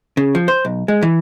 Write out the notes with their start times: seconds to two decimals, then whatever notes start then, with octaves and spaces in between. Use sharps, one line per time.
0.17 C#3
0.35 F3
0.48 C5
0.65 B1
0.88 G#3
1.02 E3